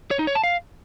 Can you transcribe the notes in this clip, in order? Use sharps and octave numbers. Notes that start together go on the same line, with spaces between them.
C#5
D#4
C#5
A5
F5